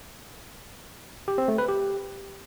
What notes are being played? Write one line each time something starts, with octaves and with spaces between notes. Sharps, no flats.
G4
C4
A3
B4
G4